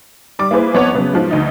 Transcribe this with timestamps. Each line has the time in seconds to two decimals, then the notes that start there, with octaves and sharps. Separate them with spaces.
0.39 G3 D6
0.51 A#3 E4 G#4 B4 C5
0.74 F2 B3 C4 C#5 F#5 D6
0.95 C#3 F#3 B3
1.13 G#2 F3
1.31 D2 D#4